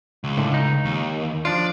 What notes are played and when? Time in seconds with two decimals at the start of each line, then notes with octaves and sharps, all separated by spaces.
0.24 C#2
0.38 A2 D3
0.54 D#4
0.85 D#2
1.45 F3 D4 F4 D5